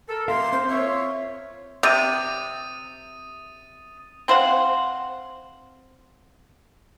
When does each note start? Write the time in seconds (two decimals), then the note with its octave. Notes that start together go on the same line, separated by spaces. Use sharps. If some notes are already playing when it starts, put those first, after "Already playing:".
0.08 A4 A#4
0.28 A#3 A#4 E5 F5 C6
0.52 C4 C5
0.68 F4 C#5 E5
1.83 C3 D#6 A6 D#7
4.28 C4 C5 F5 F#5